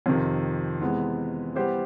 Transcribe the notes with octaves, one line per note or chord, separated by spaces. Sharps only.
F2 C3 D#3
C3 E3 G#3 B3
G3 B3 E4 G4 C5